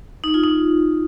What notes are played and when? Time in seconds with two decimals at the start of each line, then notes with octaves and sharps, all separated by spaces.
0.24 D#4
0.34 F4
0.44 D#4